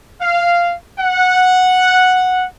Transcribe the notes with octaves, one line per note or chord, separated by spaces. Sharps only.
F5
F#5